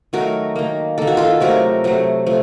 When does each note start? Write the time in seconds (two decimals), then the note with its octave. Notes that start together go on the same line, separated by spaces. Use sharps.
0.13 D#3 F#3 A3 F#4 A#4
0.56 D#3 A#3
0.98 D#3 A#3 A4
1.07 F#4
1.17 F4 A4
1.40 C3 F#3 A3 F#4 A#4
1.84 C3 F#3 A3
2.26 F3 A3